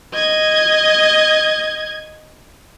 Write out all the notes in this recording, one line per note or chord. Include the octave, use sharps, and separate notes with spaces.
D#5 G#6